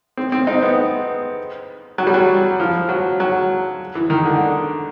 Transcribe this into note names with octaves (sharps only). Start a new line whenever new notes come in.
C4
C4
D#4
B3
F#3
G3
F#3
F3
F#3
F#3
E3
D#3
D3